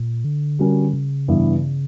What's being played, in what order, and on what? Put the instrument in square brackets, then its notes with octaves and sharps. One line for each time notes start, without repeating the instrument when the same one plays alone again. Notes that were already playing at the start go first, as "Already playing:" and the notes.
Already playing: [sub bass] A#2
D3
[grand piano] G3 C#4 F#4 A#4
[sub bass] C#3
[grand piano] G2 E3 B3 E4